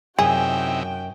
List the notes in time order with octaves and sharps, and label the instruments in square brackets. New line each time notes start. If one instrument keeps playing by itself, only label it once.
[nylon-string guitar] F#2 [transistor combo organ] C3 D#4 E4 [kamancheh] F#4 G5 [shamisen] G#4